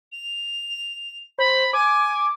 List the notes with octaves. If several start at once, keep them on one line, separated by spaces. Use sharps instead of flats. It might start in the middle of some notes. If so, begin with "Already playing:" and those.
F7
C5 B5
G#5 D6